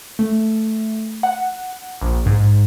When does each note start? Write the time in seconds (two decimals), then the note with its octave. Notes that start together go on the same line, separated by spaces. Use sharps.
0.19 A3
1.23 F#5
2.01 A#1
2.26 G#2